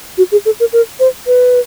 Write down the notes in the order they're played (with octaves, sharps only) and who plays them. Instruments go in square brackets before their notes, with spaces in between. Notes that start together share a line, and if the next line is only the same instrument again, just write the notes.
[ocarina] F#4
G#4
A4
A#4
A#4
C5
B4